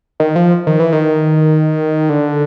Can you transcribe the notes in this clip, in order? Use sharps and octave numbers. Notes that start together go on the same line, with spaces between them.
D#3
F3
D#3
E3
D#3
D3